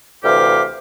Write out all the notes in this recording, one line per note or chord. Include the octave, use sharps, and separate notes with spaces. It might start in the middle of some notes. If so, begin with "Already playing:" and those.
D2 C3 E3 G4 F5 D6